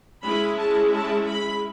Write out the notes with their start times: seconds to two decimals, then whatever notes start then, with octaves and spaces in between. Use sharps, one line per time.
0.23 G#3 C#4 E4 B5
0.57 A5
0.92 A5
1.27 B5